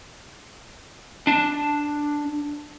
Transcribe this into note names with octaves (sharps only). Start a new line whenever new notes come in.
D4 A5